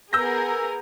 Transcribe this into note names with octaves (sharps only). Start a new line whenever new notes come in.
B3 G#4 A#4 E6 G6 A#6